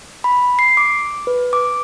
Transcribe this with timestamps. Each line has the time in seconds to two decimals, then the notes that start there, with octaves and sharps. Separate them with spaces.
0.24 B5
0.59 C7
0.77 D6
1.27 B4
1.53 D6